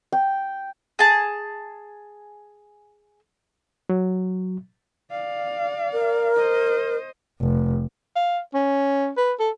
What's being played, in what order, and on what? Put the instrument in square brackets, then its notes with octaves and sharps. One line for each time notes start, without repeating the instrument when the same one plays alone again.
[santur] G5
[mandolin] G#4 A5
[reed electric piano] F#3
[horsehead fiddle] D5 F5
[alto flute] A#4
[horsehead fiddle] C5 D#5
[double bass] F1
[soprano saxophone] F5
C#4
B4
A4